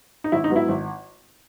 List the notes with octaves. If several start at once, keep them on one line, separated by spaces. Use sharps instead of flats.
D#4
G#1 E4
D#4
G#2 F#3 B3
E4
G#1